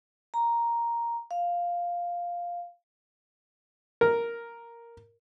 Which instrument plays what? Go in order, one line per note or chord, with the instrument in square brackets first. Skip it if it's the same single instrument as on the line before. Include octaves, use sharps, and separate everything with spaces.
[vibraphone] A#5
F5
[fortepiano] A#4